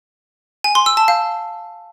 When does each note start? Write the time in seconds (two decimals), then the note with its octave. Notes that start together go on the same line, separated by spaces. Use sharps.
0.64 G#5
0.75 C6
0.86 E6
0.97 A5
1.08 F5